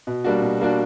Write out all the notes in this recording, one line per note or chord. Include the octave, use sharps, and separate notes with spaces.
B2
G3 A#3 D4 F#4
B2
G3 A#3 D4 F#4